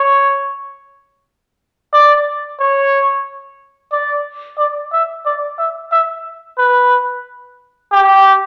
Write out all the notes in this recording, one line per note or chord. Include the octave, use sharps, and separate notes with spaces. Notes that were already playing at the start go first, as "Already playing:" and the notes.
Already playing: C#5
D5
C#5
D5
D5
E5
D5
E5
E5
B4
G4